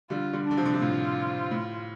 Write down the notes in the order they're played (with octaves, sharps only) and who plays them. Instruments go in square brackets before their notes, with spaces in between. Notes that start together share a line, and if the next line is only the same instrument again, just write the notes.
[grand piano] D3 G3 [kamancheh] F4
[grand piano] D3 G3
[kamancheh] D4
[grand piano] D3
C3 F3
D3
C3
[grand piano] A2 [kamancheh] F4
[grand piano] A2